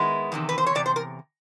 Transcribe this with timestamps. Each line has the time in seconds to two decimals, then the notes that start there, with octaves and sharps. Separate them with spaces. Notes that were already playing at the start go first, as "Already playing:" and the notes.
Already playing: D#3 G#3 B3 E4
0.32 E2 C3 D#3
0.49 B4
0.58 C5
0.66 C#5
0.75 E2 C3 D5
0.86 C5
0.96 A#4